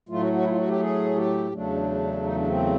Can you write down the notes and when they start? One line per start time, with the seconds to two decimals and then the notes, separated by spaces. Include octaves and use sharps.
0.09 A2 F#3 A3 F4
0.21 F#4
0.33 F#4
0.42 E4
0.49 F4
0.57 F#4
0.69 G4
0.80 G#4
1.16 G4
1.51 E2 C#3 F#3 A3 D4
2.23 D#4
2.35 D4
2.47 C4